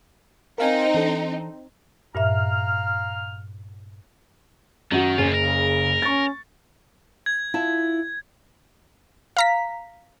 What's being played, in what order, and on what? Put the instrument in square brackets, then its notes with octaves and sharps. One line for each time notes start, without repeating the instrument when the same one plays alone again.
[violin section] C4 D#4 [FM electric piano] A#4 F5 G#5
[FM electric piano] E3 D4 A4
[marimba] G2 A#2 E5 [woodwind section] F5 A#5 F6
[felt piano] F#2 F#4 [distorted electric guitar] D#3
[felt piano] F#1 [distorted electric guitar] B2 F4 [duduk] C#4
[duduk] C#3 [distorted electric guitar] A#4
[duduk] C#4 [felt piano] C#6 A6
[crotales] G#6
[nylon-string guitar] E4 F4 A5
[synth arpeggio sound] F5 A#5 B6